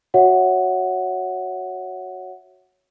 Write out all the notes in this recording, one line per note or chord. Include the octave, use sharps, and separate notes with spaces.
F#4 C#5 E5 F#5